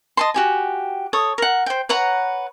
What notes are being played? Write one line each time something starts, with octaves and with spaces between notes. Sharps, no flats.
D#5 A5 C6
F#4 G4 G#5
A4 C#5 D#6
A#4 F#5
C5 G5
B4 C#5 F#5 A#5